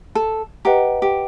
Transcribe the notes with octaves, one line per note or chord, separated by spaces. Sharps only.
A4
G4 B4 D#5 F#5 A#5
G4